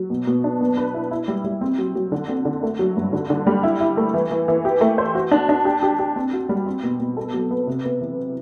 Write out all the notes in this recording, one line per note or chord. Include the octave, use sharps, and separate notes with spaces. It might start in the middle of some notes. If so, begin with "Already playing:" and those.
Already playing: F#3
B2
B2
D4
B3
B4
E4
E4
G3
G3
C4
F#3
F#3
D3
C4
D3
A3
F#3
G2
D3
D3
G3
E4
E4
A3
E3
E3
E3
G4
A3
C5
F#4
D4
D4
G4
G4
G4
C4
F#4
G3
C4
B2
B2
A4
F#3
B3
C3
B3
E3